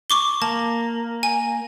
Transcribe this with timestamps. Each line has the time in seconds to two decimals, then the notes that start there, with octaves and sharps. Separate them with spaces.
0.10 C#6 D6 G7
0.42 A#3 A5
1.23 G#5